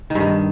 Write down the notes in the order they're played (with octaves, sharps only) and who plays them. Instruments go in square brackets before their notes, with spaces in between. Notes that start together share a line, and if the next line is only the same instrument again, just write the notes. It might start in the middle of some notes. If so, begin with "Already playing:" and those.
[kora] D#3
G2
D#3